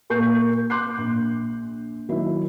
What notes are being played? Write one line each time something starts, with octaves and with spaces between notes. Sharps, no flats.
A#2 A#3 C#6 G6 C7
C6 D6 F#6 G6 C7
A#1
D#3 F#3 E4